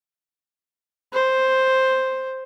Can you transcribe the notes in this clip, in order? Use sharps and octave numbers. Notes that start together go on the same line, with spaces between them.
C5